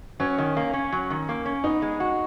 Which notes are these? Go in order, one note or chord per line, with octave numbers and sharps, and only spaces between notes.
F#3 C#4
D#3
A#3
C#4
F#3
D#3
A#3
C#4
B3 D#4
G#3
F#4